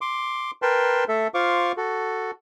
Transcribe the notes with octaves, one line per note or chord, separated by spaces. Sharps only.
C6 D6
A#4 B4 G5 A5 C6
A3 A4 E5
F4 C5 F5 C#6 D6
F#4 A4